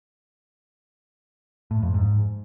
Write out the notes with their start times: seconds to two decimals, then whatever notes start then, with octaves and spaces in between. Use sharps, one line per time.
1.71 A2
1.82 F2
1.94 G#2